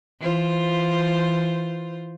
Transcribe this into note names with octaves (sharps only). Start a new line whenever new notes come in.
E3 F4 C5